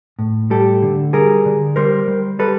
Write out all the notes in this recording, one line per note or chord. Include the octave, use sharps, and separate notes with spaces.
A2
G3 G4 A4
D3
G3 G#4 A#4
D3
G3 A#4 C5
G3
G3 A4 B4